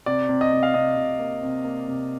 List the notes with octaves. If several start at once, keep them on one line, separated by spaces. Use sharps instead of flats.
C3 D5
C3
D#5
C3
F5
C3 D#5
C3
A#3
C3
A#3
C3